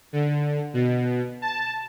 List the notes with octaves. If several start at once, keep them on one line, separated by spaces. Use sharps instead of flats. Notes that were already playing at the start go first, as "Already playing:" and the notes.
D3
B2
A5